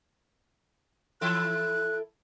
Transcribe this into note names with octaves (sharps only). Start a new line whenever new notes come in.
E3 E4 A4 F#6